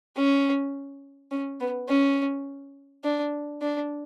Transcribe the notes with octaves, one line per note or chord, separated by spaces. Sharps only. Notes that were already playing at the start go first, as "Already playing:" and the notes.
C#4
C#4
B3
C#4
D4
D4